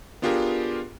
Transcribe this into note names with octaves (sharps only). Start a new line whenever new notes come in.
B3 D4 F4 G4 G#4 A#4